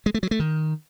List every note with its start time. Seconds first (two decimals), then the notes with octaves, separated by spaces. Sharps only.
0.06 G#3
0.14 A3
0.23 F#3
0.31 A3
0.40 D#3